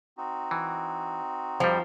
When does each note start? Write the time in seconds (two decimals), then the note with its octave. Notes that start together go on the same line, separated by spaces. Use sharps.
0.18 C4 D#4 F#4
0.51 E3
1.60 F2 F3 G3